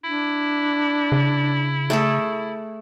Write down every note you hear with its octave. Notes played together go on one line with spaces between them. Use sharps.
D4 E4
C#3
A3 G#4 A4